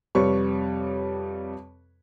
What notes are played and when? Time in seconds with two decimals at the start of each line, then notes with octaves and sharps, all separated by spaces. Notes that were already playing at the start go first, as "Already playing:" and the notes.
0.15 F2 C3 G3 B4 C#5 C#6